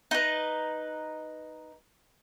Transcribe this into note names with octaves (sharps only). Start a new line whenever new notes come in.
D#4 B4